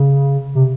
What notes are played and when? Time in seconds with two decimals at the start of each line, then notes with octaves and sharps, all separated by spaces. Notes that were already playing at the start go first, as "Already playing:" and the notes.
Already playing: C#3
0.55 C3